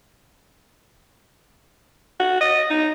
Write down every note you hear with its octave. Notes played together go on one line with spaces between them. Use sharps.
F#4
D#5
D#4